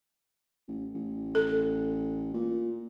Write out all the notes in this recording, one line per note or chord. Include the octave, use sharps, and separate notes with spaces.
A1
A1
A4
A#2